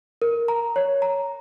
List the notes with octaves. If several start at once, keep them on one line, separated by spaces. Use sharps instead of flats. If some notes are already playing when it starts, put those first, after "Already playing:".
A#4
A#5
C#5
A#5